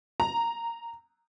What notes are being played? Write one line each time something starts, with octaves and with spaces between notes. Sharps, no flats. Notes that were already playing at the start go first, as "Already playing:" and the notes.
A#5